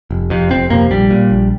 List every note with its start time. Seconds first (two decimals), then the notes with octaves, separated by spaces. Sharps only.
0.10 F1
0.30 F2 C3
0.50 F1 C4
0.70 F2 C3 A#3
0.90 A#1 G3
1.10 A#2
1.31 A#1